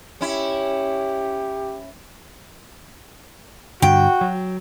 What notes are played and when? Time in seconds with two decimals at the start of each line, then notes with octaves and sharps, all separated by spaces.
0.21 C#4 E4 G4
3.82 G2 D3 F#4 G5
4.21 F#3